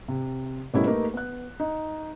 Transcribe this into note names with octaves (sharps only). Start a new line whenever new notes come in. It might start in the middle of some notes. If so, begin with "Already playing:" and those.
C3
B2 G3 A3 C#4 E4 A#4
A3 A#3 D#4 G4 A#4 B4
B3 F#6
D#4